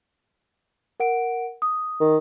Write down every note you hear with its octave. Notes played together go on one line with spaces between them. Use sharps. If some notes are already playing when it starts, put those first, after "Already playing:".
A#4 F#5 D7
D#6
D#3